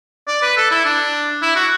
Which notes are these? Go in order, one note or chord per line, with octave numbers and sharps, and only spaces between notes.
D5
B4
A4
E4
D4
E4
F#4